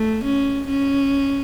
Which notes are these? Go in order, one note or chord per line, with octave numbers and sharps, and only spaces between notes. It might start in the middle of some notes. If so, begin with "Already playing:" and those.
Already playing: A3
C#4
C#4